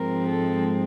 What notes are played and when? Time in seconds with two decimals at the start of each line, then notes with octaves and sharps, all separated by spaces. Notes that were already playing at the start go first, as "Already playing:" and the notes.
Already playing: G#2 F3 G#3 C4 A#4
0.28 A4